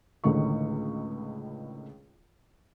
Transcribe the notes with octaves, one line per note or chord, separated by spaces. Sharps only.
C#2 A2 D3 D#3 C#6